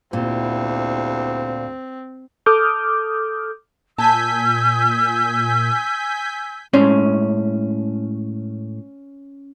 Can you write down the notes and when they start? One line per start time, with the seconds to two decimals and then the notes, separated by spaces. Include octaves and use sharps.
0.13 D2 A#2 B3 C4 E4 G4
2.46 A4 D6 D#6 F6 G6
3.98 A#2 G#5 A5 E6 G6 B6
6.73 A2 G#3 C#4 C5